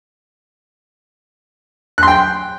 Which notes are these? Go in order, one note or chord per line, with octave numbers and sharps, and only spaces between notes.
G5 C6 F#6